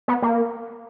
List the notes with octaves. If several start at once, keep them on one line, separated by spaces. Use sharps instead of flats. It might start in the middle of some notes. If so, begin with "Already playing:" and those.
B3
A#3